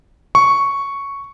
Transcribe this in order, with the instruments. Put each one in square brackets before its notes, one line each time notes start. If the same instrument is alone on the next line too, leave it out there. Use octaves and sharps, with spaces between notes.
[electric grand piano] C#6